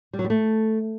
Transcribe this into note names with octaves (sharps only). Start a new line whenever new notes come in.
G3
F#3
G3
A3